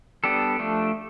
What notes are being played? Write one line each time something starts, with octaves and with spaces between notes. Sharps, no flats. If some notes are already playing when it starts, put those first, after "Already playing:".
G3 B3 D4 G4 A4
F3 A3 D4